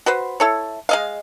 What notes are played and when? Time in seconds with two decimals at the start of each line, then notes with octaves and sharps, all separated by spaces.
0.06 F#4 B4 C5
0.40 E4 A4 C#5
0.89 G#3 D#5 F5